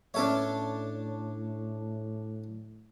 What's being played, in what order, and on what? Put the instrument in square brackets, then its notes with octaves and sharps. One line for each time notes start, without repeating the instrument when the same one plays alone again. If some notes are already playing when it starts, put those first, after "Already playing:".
[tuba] A2 [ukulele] C#4 B4 E5 [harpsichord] D4 A4 C#5